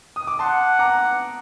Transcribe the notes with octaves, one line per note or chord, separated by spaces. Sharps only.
D#6
D6
F#5 A5 C6
A#5 D6